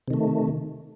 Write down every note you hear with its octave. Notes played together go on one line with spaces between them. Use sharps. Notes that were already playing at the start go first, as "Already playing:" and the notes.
C3 D#3 A3